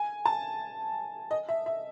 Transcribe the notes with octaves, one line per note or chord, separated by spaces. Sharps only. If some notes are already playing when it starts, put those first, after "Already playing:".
Already playing: G#5
A5
D#5
E5
E5